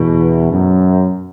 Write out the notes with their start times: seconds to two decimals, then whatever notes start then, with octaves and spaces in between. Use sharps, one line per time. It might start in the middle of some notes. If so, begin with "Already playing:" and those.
Already playing: E2 B2
0.50 F#2